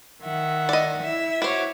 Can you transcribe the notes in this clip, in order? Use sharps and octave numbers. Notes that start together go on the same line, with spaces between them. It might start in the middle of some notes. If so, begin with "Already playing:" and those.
D#3 E5 F#5
D5 D#5
E4 E5
F#4 C5 C#5 D6